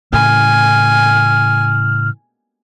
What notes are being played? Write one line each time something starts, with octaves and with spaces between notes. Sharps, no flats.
A2 C#3 E3 G#5 F6